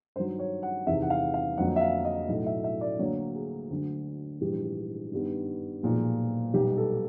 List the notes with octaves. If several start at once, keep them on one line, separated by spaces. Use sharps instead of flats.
G2 D#3 F#3 C5
C#5
F#5
E2 C3 D#3 E5
F#5
F5
F5
F2 D3 F#3 A#3 F#5
E5
F5
D#5
B1 A2 F#3 A3 D#5
E5
E5
D5
D2 D3 F#3 A#3 C#5
G#4
D2 D3 F#3
A#1 G#2 E3 G3 G4
G2 D#3 G3 B3
B1 A#2 F3 G#3
B1 B2 G3 B3 G4
A4